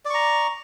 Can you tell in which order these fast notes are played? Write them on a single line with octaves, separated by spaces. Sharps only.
D5 C#6 A#5